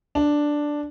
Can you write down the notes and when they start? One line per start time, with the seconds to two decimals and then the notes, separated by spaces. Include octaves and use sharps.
0.15 D4